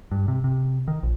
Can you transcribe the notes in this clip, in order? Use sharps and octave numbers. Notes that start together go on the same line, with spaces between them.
G2
C3
C3
D#3
A#1